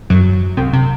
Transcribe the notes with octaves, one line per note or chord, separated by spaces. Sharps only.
F#2 F#3
C2 C3
C3